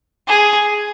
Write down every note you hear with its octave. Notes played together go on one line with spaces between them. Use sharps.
G#4